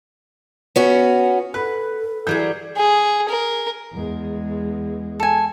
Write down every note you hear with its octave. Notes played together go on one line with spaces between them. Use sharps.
B3 C#4 F#4
A4 B4 F#6
E3 F#3 G3 G#4 G6
G#4
A#4
E2 G#3
A4 G#5